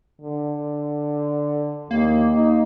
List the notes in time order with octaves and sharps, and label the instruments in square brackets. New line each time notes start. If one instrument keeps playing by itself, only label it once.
[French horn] D3
[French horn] D#2 [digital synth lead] A#3
[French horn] D#4